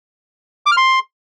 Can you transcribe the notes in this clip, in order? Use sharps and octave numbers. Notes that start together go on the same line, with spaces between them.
D6
F6
C6